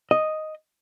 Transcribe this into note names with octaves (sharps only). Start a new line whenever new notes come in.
D#5